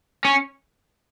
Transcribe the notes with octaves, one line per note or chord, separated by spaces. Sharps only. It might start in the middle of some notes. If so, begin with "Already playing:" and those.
C#4